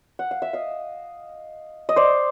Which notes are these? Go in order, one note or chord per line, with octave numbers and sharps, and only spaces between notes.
F#5
F5
E5
D#5 F5
D#5
C5 D5